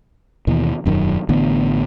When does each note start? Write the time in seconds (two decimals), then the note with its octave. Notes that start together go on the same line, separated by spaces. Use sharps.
0.47 D#2 B2 E3
0.86 E1 F#2 D#3
1.29 A1 D3 B3